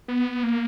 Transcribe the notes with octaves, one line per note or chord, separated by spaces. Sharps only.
B3
A#3